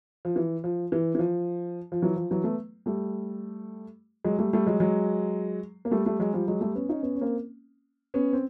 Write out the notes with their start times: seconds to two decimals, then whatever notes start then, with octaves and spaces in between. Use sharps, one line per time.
0.25 F3
0.36 E3
0.64 F3
0.92 E3
1.15 E3
1.19 F3
1.92 F3
2.02 E3 F#3
2.16 F3
2.31 E3 F#3
2.44 A3 B3
2.86 G3 A3
4.24 F#3 G#3
4.39 G3 A3
4.53 G3 A3
4.67 F#3 G#3
4.80 F#3 G#3
5.85 A#3
5.91 G3 A3
6.06 G3 A3
6.19 F#3 G#3
6.33 F3 G3
6.48 F#3 G#3
6.61 G3 A3
6.75 B3 C#4
6.89 C#4 D#4
7.03 B3 C#4
7.15 C#4
7.21 A#3 C4
8.14 B3 C#4
8.33 C4